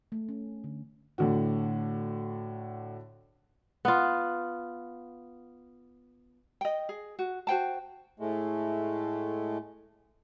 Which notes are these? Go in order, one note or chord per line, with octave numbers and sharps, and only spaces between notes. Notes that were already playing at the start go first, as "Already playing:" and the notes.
A3
C#4
D3
A2 D3 F#4
B3 F4
D#5 G5
G#4
F#4
F#4 C5 G5 A5
A2 G#3 A3